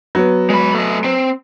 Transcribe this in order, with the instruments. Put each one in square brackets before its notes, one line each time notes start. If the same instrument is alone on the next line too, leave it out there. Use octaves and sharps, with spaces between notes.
[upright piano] F#3 B3
[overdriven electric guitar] G#3 B5
A3 D#5
C4